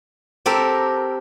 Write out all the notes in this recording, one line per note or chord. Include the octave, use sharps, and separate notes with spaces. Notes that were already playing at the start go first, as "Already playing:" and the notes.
C4 G4 A4 A#4